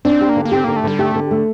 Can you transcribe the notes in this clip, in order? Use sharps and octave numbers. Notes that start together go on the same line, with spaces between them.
C4 D4
G4
A#3
D3
A#3
C4 G4
D3 A#3
A3
D3 G3
A3 G4
D3
A3